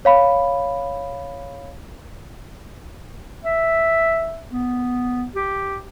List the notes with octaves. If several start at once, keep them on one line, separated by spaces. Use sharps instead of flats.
C#5 F5 B5
E5
B3
G4